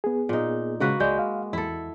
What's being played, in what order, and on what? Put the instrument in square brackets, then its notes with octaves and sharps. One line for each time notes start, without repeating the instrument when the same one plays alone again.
[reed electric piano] B3 G#4
[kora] A#2 D#4
[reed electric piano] C#3 G#3 [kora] A#3 F#4 B4
[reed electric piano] C#2 D5 G6 [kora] G#3
[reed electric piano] F5
[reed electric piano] E2 [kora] E4 A4